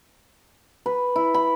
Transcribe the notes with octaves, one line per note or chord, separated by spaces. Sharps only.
B4
E4
B5